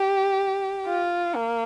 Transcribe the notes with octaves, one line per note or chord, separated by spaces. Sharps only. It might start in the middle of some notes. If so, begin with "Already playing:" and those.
Already playing: G4
F4
A#3